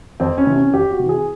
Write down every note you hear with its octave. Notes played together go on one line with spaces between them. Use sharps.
F2 C4
C#4
C3 E3
C#4
F2 G4
F#4
C3 E3
G#4